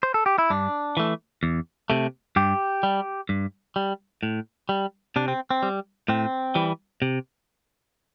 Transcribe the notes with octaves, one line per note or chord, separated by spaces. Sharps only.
C5
A4
G4
E4
G2 D4
E3 A3
E2
C3 A3
G2 G4
G3
G2
G3
A2
G3
C3 D4
C4
C4
G3
A2 C4
E3 G3
C3